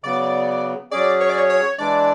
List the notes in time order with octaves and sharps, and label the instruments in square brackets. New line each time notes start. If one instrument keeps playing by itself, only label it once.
[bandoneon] C#3 F#3 B3 [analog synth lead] D5
[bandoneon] F#3 C#4 G#4 [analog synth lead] D5
[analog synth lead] C#5
D5
C#5
C#5
[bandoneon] E3 G#3 D4 [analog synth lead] D5